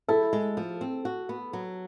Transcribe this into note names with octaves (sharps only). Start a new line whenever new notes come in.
E4 A4
G#3
F3
C4
F#4
B3
F#3